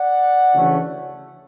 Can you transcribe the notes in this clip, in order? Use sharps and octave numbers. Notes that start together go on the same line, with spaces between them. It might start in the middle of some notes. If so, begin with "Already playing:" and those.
Already playing: D5 F#5
D2 C#3 E3 A3 C#4